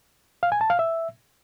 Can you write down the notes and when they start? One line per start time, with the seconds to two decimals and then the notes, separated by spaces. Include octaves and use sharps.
0.43 F5
0.52 G#5
0.61 A5
0.70 F5
0.79 E5